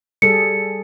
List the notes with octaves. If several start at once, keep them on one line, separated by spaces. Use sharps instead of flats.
G3 G#4 A4 C#7